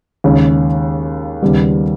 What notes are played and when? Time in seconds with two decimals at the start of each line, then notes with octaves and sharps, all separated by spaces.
0.24 D#2 C#3 G#3 C#4
1.42 D#2 C#3 G3 B3